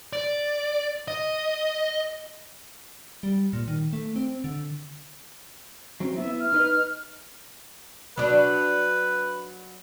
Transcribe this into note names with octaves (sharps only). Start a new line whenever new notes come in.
D5
D#5
G3
A#2
D#3
A3
C4
D3
F#3 C4 C#4
B3 E4 E5
F6
D#4 B4 D#5
F#3 D4 B4